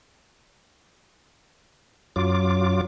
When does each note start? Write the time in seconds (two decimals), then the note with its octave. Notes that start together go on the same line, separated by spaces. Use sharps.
2.16 F#2 F#3 F4 D6